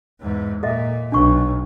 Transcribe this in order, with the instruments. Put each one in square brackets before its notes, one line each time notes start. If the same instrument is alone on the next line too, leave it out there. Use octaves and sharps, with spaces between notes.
[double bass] E2 G#2
[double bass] A#2 [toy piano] A4 D#5 E5
[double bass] B1 [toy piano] D4 C#6